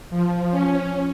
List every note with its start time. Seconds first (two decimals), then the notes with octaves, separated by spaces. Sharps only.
0.10 F3
0.51 C#4